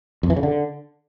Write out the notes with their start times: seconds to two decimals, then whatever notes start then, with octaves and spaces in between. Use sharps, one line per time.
0.23 F2
0.30 E3
0.36 C#3
0.43 D3